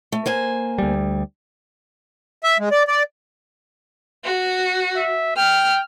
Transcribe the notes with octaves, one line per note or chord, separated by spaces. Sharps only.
A3
A#3 C5 G#5
D2 G3
E5
G#3
D5
D5
F#4
E5
G5 F6